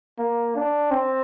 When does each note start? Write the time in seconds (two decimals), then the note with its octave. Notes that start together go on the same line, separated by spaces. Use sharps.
0.19 A#3
0.56 D4
0.91 C4